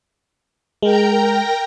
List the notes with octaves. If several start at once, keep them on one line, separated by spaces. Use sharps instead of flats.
G#3 A#4 G5 A#5